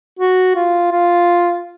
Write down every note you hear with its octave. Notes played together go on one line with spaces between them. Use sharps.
F#4
F4
F4